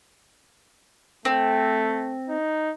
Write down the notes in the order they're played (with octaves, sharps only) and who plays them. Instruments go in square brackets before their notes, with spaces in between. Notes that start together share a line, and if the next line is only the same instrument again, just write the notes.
[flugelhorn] A3 [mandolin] C4
[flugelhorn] D#4